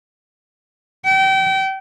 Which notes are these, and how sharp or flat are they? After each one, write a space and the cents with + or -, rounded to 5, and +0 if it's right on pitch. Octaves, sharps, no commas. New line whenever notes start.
G5 -30